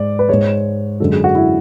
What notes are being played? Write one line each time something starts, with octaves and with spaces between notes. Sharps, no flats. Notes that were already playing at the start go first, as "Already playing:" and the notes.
Already playing: G#2 G#3 D5
B4
G#2 G#3 C#5
F#2 D3 G#3 A4
G#4
F#4
E4